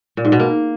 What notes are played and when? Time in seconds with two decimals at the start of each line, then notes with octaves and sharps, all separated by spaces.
0.17 A#2
0.25 G#2
0.32 B2
0.40 A#3